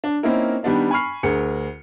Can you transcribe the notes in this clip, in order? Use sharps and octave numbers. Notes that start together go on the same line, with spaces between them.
D4
A#3 C4 C#4 D#4 E4 A#4
D#3 G3 B3 D4 D#4
G#5 B5 C#6 F6 C7
D2 G#4 A#4 C#7